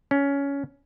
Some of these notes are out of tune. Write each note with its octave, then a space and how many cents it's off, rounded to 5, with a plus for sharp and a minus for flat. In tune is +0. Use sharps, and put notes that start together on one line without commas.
C#4 +15